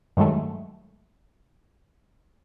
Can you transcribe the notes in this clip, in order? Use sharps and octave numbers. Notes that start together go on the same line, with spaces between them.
G2 D#3 F#3 G#3 A3